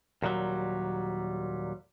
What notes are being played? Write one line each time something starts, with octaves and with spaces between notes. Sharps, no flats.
D#2 A#2 D3 F#3 G3